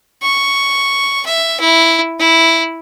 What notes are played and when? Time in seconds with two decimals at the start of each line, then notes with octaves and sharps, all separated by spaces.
0.22 C#6
1.26 E5
1.60 E4
2.20 E4